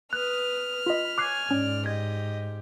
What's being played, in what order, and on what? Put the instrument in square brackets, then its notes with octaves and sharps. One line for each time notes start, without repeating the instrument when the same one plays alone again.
[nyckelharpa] B4 D#6 [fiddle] F6 [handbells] F#6
[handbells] F4 D#5 [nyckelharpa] B5
[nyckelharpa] C#5 G#5 [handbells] D6 F#6 C7
[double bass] G#2 [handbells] C#4 [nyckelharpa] D5
[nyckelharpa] G4 [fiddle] D#5 [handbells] G#6